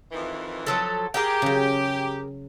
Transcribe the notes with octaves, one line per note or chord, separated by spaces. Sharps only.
F2 D#3 E3
F3 F#3 A4
G4 G#4 A#4 G5
C#3 F#3